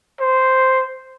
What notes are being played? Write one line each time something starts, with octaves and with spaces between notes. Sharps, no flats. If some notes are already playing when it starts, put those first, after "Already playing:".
C5